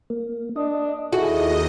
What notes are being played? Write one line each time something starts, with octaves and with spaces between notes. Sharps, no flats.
A#3
D4 D#5
D#2 E4 F#4 G#4 A4 D#5